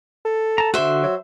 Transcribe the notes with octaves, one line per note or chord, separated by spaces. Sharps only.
A4
A5 A#5
D3 F#4 C5 E5
F#3